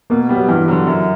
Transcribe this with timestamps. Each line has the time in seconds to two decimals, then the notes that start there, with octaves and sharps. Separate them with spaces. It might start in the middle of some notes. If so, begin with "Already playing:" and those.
0.10 B2 A#3
0.29 G3 B3
0.36 F#3
0.48 G2 E3
0.68 D3 F#3
0.87 F#2